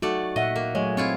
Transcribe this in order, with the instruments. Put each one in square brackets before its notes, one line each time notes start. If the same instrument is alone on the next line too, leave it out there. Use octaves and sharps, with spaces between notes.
[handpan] F#3 D#4 F#4 [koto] A3 D5 F#5
[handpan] A#2 E5 F#5 [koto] D#5
[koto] A#3
[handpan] F#3 A3 C#5 [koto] G#3
[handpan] C4 [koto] E4 F4 C#5